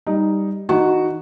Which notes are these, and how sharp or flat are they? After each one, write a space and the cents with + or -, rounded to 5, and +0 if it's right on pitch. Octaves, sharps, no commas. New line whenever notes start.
G3 +5 D#4 +0
E3 -40 D#4 -15 F#4 +0